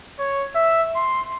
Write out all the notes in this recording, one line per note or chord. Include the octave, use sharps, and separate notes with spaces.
C#5
E5
C6